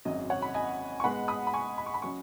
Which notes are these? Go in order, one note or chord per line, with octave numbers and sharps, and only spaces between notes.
G#1 F#2 F#3 C#4 D#5
C#5 F#5
B5
D#5 G#5
C#6
G#2 G#3 B3 F#5 B5
B5 D#6
B5
G#5 C#6
B5
C#6
B5
F#3 C#4 C#6